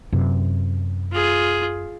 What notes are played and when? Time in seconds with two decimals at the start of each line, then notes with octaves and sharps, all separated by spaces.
0.13 F#2 C3
1.12 F4 G#4